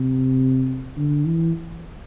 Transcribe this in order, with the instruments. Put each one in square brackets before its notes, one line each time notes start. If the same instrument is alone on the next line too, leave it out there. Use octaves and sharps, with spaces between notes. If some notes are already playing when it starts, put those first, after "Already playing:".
Already playing: [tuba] C3
D3
E3